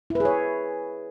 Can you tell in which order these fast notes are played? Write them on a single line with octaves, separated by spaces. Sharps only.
E4 B4 G#4 C#5